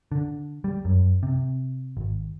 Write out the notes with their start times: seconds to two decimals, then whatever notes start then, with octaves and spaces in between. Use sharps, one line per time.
0.12 D3
0.64 G3
0.85 F#2
1.23 C3
1.97 G#1